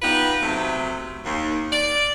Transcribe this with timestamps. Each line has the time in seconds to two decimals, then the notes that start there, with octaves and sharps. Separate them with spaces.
0.02 B3 D#4 F4 G4 B4
0.42 C3 F#3 A3
1.25 D#2
1.73 D5